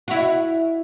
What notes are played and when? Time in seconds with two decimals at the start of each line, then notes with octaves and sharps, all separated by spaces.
0.08 E4 F#4